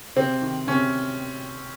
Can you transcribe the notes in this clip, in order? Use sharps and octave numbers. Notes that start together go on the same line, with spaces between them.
C3 C4
D#3
C3 C#4